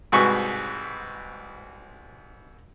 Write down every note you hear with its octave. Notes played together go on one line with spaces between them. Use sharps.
C2 G#2 F#4 G#4 B4 C#6